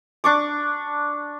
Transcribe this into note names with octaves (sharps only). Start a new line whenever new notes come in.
D4 C#6 D6